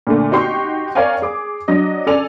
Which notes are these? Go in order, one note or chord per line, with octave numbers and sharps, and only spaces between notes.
A#2 D3 A3
D#4 F#4 G4 G5 C6 C#6
A#4 C#5 D5 F5 G5 G#5
G#4 G#5 D6
F#3 D4 D#5
C#3 A4 D5 G#5 F7